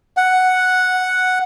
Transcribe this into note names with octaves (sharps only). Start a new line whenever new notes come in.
F#5